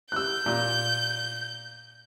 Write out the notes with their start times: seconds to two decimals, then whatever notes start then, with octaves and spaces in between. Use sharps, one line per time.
0.12 E6 F#6 G6
0.46 A#2